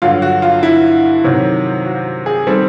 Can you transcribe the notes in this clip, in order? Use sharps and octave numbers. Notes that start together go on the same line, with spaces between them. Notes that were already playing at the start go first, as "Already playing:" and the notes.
G2 D3 F#3 F4
F#4
F4
E4
C3 D#3 F#3
F#4
G#4
D#3 G3 C4 A4